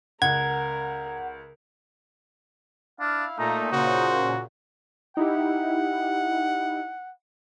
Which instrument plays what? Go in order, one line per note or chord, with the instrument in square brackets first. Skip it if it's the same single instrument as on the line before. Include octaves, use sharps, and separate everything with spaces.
[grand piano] C#2 [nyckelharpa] A#4 [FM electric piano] F#5 [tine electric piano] G#6
[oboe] D4 [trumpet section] E4 F5
[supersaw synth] A#2 [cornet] A3 [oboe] D#4 [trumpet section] A#5
[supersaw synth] A#2 C#3 [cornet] F#4 [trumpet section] C5
[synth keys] D#4 E4 G4 [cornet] F#5